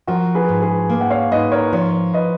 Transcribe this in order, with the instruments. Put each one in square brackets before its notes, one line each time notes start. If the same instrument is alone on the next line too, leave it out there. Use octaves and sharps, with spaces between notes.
[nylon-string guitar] F3 [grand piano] F#4 A#4
[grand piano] G#4 B4
[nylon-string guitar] G#2
[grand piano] G#4 B4
[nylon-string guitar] A#3
[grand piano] F#5
C#5 F5
[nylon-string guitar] G#2 [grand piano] B4 D#5
[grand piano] A#4 C#5
[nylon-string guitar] F3 [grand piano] A#4 C#5
[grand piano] B4 D#5